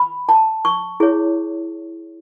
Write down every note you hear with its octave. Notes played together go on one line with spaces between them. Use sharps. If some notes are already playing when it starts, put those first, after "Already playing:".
Already playing: B5
A5
C#6
E4 G#4 C#5